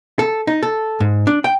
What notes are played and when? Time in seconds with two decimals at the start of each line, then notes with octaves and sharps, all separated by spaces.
0.19 A4
0.47 D#4
0.63 A4
1.00 G#2
1.27 D4
1.44 G5